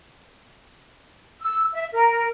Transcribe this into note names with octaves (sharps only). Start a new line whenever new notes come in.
E6
E5
A#4